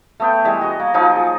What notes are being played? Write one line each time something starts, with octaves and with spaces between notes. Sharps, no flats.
A3 B3 G5
E3 G3 G#3
F#4 D#5
A#3
F3 F#3 D#4 F4
G#4